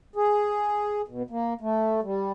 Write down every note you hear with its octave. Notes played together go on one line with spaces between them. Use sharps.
G#4
B2
A#3
A3
G3